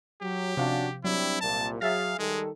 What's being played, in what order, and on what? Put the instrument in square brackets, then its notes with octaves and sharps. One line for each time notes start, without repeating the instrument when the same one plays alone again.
[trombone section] F#3 [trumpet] G4
[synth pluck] C3 F3 F5 [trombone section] C#4 D4 F#4
[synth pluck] F#3 [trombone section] G3 C4 D4 [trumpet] E4
[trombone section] C2 A#2 [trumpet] A5
[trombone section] F#3 G#4 [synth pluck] E5 A6 [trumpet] F5
[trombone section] D#3 G3 A4 [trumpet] G#3